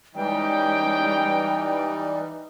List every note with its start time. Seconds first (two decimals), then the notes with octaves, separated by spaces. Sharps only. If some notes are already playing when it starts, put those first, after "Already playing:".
0.15 E3 G3 G#3 C#4 D#4 G5